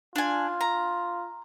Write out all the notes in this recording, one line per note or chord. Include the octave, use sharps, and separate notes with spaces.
D4 F4 G#5
A#5